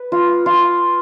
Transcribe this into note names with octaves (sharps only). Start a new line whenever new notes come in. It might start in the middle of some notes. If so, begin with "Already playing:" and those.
Already playing: B4
F4
F4